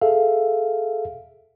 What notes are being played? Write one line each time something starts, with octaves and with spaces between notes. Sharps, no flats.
G#4 A4 E5 F5